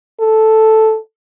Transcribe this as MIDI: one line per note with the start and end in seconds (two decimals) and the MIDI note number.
0.20 0.97 69